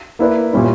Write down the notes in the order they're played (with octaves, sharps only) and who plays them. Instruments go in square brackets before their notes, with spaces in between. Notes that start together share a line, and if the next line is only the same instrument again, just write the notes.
[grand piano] A#3 E4 B4 D5
A#2 G3 C#4 E4